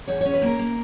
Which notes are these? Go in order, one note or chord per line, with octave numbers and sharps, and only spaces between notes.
E2 C#5
C#4 C#5
B4
A#3 A#4
A#3